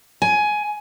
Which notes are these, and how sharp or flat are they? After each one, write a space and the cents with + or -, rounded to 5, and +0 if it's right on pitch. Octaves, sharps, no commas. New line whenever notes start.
G#5 +15